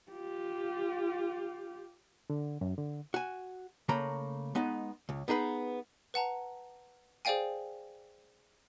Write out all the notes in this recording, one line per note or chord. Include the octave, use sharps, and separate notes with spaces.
F4 G4
D3
F#2
D3
F#4 G#5
C#3 A3 A#3 A#5 B5
G#3 B3 D#4
C#2
B3 D#4 G#4 B4
B4 F#5 A5 A#5
G#4 C5 D5 F5 G5 G#5